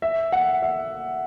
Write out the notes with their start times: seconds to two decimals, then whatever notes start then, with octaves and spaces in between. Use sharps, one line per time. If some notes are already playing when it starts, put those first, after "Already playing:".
0.02 E5
0.32 F#5
0.62 E5